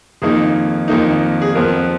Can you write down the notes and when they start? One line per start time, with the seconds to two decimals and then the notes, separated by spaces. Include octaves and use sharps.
0.22 F2 D#3 A#3 D#4 G#4
0.88 F2 D#3 A#3 D#4
1.42 G#4
1.55 F2 F3 B3 A#4